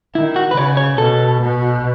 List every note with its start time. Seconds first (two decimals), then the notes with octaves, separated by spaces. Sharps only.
0.15 D#3 E4
0.36 F#4
0.51 B4
0.56 C#3 C#5
0.77 C#5
0.98 B2 A4
1.40 B2